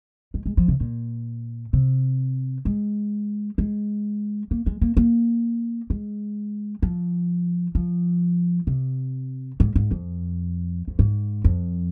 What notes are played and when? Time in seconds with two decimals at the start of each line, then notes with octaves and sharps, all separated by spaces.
0.34 G#3
0.46 G#3
0.57 F3
0.68 C3
0.81 A#2
1.73 C3
2.65 G#3
3.58 G#3
4.51 A#3
4.66 G#3
4.81 A#3
4.97 A#3
5.90 G#3
6.82 F3
7.75 F3
8.67 C3
9.60 G#2
9.76 G#2
9.91 F2
10.88 F2
10.99 G#2
11.44 F2